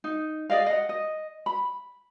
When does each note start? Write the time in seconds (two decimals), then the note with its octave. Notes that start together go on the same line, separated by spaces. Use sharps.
0.04 D#4
0.50 G#4 D5 D#5 F5
0.67 D#5 F#5
0.89 D#5
1.46 B5